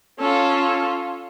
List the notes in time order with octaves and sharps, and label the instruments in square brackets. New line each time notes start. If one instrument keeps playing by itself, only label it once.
[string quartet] C#4 F4 A4